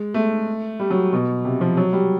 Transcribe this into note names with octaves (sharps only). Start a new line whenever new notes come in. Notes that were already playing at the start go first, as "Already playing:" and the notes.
Already playing: G#3
A3
G3
F#3
B2
C3
F3
F#3
G3